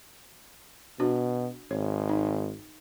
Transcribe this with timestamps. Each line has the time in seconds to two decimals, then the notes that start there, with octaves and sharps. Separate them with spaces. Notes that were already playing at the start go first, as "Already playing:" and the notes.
1.00 B2 D4 F#4
1.71 G#1 C#5
2.09 D#4